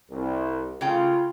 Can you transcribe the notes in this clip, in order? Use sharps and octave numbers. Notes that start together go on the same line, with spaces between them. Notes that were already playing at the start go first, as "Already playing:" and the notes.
C2
C#3 A3 F4 G5